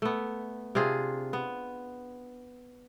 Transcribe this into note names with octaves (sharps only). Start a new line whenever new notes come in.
A3 B3
C3 D4 F4 G#4
B3